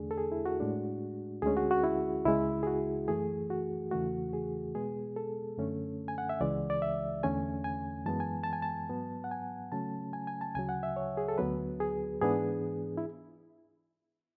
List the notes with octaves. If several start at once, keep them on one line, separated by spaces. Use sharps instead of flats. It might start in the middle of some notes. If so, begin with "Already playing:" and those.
Already playing: E2 D3 A3 D4 G#4
A4
G#4
E4
F#4
A2 G#3 D4
D2 D3 G#3 C#4 G#4
F#4
F#4
E4
C#2 C#3 G#3 E4
G#4
F#4
F#2 E3 A3 G#4
F#4
E2 C#3 E3 A3 F#4
G#4
B2 G#3 B3 G#4
A4
F#2 D3 A3 C#4
G#5
F#5
E5
C#2 C#3 E3 G#3 D5
D5
E5
E2 D3 A3 C#4 G#5
G#5
F#2 E3 G#3 B3 A5
G#5
A5
G#5
A5
G#2 F#3 B3
F#5
G#5
C#3 F#3 A3 C#4 A5
G#5
G#5
A5
D2 C#3 F#3 G#5
F#5
E5
C#5
G#4
A4
D2 D3 F#3 B3 B4
G#4
G#2 E3 B3 D4 G#4
E4